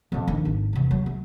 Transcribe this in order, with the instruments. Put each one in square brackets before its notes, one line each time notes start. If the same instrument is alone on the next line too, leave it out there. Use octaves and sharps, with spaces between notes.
[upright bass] F2 A#2
D#3 D4
G#1
E2 C3
F#3
A3